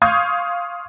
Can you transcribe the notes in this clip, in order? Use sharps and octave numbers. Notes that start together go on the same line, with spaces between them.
F5 C6 C#6 D#6 G6 G#6